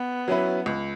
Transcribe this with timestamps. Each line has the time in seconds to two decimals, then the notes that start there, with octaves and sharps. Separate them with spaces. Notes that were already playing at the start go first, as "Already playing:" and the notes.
Already playing: B3
0.28 F#3 C#4 E4 B4
0.66 C#2